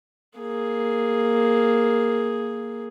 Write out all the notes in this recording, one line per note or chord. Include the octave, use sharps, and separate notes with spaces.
A#3 G#4